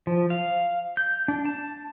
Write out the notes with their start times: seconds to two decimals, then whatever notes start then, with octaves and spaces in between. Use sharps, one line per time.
0.07 F3
0.30 F5
0.97 G6
1.28 D4
1.45 A5